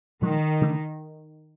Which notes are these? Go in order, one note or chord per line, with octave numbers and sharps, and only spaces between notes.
A#2 D#3 F3 G#3
C#3 E3 A3 D4